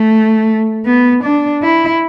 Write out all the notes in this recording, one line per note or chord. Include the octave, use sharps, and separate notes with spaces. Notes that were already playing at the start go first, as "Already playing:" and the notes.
Already playing: A3
B3
D4
E4